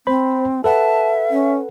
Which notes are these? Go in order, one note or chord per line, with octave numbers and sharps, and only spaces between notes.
C4 C5 B5
A4 B4 E5 F#5 A5
C#4